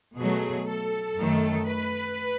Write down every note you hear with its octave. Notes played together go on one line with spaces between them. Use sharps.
B2 F#3 A3 G#4
A4
F#2 D#3 A3
B4